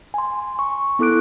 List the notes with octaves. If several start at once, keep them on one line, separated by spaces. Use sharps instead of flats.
G#5 C6
C#6
B3 E4 A4 D6 F#6 D7